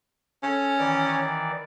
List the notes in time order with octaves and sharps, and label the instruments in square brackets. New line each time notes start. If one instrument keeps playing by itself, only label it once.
[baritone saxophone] C#4 [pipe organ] A4
[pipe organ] D#3 E3 D5